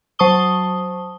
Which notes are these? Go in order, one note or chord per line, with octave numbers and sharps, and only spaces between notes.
F#3 C5 A5 C#6 D#6 G7